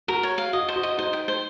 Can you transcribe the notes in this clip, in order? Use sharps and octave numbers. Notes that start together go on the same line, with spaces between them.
F#4 A#4
C#5
F5
F#4 D#5
C5
F#4
D#5
D#4 C5
G5
C5